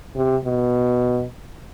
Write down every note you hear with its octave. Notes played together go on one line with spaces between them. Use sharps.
C3
B2